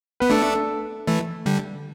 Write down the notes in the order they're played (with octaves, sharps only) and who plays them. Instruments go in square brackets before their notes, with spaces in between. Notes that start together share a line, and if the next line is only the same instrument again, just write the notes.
[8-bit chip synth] B3 [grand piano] B4
[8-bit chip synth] A3 D4 [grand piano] A4
[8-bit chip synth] E3 A3
D3 G3